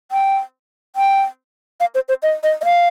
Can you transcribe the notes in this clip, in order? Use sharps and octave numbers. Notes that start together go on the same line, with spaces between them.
G5
G5
F5
C5
C5
D#5
D#5
D#5
F5